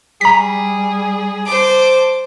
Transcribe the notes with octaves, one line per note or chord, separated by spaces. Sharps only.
G3 G#4 A#5 B6
C5 A5 D6